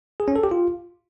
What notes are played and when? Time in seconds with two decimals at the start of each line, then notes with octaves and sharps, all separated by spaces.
0.20 G#4
0.28 C#4
0.36 A4
0.44 G4
0.51 F4